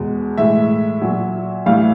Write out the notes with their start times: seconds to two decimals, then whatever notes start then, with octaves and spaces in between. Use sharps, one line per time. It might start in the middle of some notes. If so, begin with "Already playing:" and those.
Already playing: E2 B2 G#3
0.38 A2 E3 G#3 E5
1.02 A#2 F#3
1.66 A2 E3 G3 F5